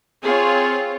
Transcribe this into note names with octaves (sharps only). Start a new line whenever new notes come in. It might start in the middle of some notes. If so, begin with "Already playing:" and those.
C4 F4 G#4 C#5